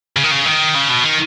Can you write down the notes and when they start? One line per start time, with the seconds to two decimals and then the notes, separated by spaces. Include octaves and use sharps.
0.16 C#3
0.24 D#3
0.31 C#3
0.46 D#3
0.75 C#3
0.90 B2
1.05 D#3